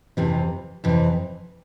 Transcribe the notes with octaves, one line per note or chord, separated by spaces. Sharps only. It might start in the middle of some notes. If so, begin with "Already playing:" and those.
F2 C3 E3
F2 C3 E3